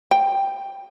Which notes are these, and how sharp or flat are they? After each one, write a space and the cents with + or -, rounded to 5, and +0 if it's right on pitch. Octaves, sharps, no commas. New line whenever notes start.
G5 +5